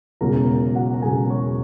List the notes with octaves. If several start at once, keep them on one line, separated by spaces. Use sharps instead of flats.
E1 E2 C#3 F#3 A#4 A#5
F#4 F#5
A#5
E1 E2 C#3 F#3 G#4 G#5
C#5 C#6